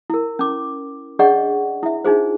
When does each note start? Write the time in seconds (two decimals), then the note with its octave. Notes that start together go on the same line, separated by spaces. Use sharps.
0.10 E4 A#4
0.39 C#4 D6
1.19 D4 G#4 D5 D#5 F#5 C#6
1.83 E4 E5
2.04 D4 D#4 F4 G#4 C5